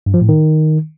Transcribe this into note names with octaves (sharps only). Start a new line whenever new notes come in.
G2
F3
A2
D#3